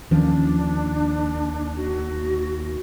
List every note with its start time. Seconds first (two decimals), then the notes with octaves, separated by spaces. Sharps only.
0.11 D#2 D#3 F3 C#4 D4
1.76 F#4